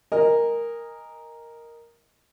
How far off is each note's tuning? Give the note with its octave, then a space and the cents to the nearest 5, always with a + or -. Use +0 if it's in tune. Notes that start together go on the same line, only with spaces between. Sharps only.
A#4 +0 D#5 +0 G#5 -25